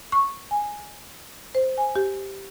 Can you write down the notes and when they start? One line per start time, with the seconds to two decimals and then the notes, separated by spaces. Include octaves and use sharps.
0.12 C#6
0.51 G#5
1.55 C5
1.78 G#5
1.96 G4